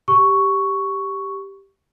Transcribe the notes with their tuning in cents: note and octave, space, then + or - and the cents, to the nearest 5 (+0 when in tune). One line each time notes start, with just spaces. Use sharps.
G4 +0 C#6 +5